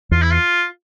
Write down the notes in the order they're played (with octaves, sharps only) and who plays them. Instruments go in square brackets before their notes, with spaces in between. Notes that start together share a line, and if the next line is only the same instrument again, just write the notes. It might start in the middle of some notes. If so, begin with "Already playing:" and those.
[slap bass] E2 [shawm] F4
[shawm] E4
F4